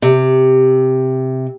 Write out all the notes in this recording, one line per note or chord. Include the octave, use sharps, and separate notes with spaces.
C3